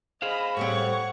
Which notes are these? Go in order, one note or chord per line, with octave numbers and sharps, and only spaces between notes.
G#4 C5 D#5 F5 B5
A2 G3 C4 C#5 F#5 C#6